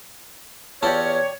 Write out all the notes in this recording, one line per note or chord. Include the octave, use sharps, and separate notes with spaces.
E2 E4 F4 G4 C#5 D5 A5